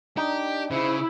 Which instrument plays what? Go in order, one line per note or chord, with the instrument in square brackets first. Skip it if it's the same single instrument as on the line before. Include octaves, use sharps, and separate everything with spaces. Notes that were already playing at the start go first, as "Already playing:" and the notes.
[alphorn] D4 [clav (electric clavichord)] D#4 [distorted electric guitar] G4
[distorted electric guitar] C#3 [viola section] E4 [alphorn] C5